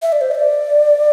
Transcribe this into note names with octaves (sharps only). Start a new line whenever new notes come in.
E5
D5
C5
E5
D5